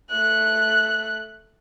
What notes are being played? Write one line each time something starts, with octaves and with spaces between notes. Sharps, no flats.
A3 F#6